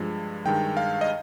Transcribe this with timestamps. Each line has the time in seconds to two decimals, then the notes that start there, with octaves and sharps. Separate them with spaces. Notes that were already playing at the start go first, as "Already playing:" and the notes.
Already playing: G2 F3 G#3
0.45 G2 D#3 G#3 G5
0.77 F5
1.01 D#5